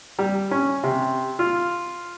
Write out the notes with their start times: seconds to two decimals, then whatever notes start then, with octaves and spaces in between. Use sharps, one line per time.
0.19 G3
0.51 C#4
0.83 C3
1.39 F4